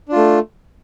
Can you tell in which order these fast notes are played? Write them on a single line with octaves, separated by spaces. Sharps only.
D4 F4 A3